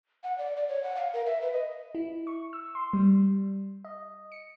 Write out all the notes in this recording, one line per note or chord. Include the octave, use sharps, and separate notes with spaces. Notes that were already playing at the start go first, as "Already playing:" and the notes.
F#5
D5
D5
C#5
F#5
F5
A#4
E5
B4
D#5
E4
C#6
E6
C6
G3
D#5
C#7